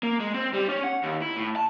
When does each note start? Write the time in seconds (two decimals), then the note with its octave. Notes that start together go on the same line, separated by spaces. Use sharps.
0.03 A#3
0.20 G#3
0.34 C4
0.53 G3
0.69 C#4
0.84 F#5
1.03 D#2
1.22 E4
1.37 A2
1.56 A5